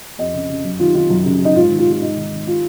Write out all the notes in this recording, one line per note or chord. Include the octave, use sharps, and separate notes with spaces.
F2 D#5
C#3
C#3
F#2
D#3 F4
D#3 F4
F#2
C#3
C#3 D#4
G#2 F4
D#3
F4
D#3
F4
G#2 D#4
D#3
D#3
F4